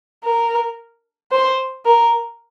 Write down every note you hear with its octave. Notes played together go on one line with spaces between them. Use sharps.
A#4
C5
A#4